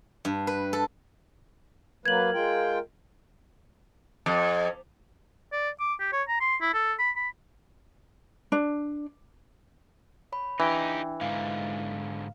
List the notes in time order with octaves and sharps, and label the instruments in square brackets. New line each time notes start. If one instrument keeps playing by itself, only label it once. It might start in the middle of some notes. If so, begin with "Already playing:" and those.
[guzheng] G2
B4
A4
[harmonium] F#3 A#3 B4 [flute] A#4 [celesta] G#6 F#7
[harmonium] G#3 F4 G5
[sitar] F2
[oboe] D5
D6
G4
C#5
A#5
C6
E4
A4
B5
B5
[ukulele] D4
[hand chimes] C#5 B5
[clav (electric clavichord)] E3 [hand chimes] D4 G5 [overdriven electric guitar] D#4 G4
[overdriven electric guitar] G#2 D3 [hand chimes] F5